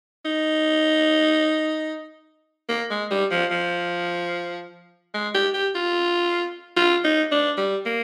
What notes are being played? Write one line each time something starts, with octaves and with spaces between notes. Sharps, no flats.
D#4
A#3
G#3
G3
F3
F3
G#3
G4
G4
F4
F4
D#4
D4
G3
A#3